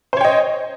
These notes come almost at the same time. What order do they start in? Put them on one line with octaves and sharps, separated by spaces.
C5 C#5 G5 D#5